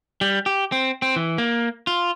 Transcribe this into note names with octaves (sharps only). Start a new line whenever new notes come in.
G3
G4
C4
C4
E3
A#3
F4